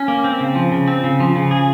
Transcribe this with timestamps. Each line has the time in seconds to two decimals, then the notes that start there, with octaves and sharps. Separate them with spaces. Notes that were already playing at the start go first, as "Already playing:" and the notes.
Already playing: C#4
0.08 A#3
0.24 C4
0.40 C#3
0.55 F3
0.72 C#3
0.88 C4
1.04 C#3
1.20 F3
1.36 C#3
1.51 G#4